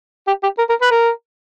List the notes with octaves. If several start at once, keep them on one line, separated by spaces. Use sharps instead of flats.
G4
G4
A#4
A#4
B4
A#4